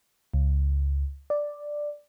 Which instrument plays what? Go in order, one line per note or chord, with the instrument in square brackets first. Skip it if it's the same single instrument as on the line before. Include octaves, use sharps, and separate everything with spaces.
[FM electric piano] C#2
D5